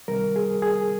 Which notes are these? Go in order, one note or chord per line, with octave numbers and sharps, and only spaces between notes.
C#2 C3 D#3 G3 A#4
G#4
G#4